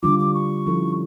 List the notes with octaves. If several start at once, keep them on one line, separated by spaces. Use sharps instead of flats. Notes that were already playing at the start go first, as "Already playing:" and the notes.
D3 G3 D4 F4 D6
D6
C#6
F3 C#4 E4 A4